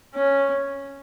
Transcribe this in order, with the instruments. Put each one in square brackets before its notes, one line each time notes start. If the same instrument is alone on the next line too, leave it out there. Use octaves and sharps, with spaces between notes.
[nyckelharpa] C#4